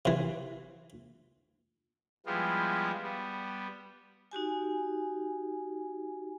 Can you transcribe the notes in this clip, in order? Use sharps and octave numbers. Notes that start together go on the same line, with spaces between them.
C3 E3
F3 G3 G#3 B3 E4 F4
G3 B3
D#4 F#4 G4 G#5